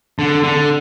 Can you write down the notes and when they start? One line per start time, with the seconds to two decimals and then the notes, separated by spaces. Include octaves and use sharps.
0.19 D3
0.43 D3